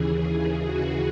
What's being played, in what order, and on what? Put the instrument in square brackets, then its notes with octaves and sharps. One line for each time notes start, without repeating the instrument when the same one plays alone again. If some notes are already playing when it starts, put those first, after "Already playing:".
Already playing: [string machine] D#2 C#3 E3 G#4
F#4